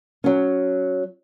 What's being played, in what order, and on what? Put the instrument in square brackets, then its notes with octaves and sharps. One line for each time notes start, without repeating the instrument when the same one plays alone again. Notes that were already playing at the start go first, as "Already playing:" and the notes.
[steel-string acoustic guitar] F#3 C#4